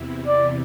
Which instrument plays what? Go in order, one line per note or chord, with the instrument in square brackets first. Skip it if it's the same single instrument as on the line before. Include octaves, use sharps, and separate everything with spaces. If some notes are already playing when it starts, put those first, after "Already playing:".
Already playing: [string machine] E2 C3 E3
[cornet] D5